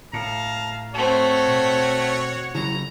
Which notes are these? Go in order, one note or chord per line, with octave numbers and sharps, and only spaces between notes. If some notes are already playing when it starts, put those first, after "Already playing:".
A2 F5 A5 A#5
A3 C4 F#4 C#5
B2
C#3 F#3 E4 A#5